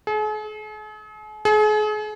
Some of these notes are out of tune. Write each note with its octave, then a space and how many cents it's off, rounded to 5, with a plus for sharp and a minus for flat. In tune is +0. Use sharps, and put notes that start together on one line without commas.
G#4 +45
G#4 +40